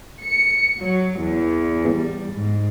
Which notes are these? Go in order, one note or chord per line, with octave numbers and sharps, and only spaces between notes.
C#7
F#3
E2
G3
G#2